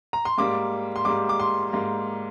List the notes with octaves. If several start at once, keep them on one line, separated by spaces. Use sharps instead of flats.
A#5
C6
G#2 G3 A#3 D6
C6
G#2 G3 A#3 D6
D6
C6
G#2 G3 A#3